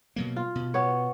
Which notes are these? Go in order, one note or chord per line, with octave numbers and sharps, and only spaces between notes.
B2 F#3 A#3
F4
B2
B3 C#5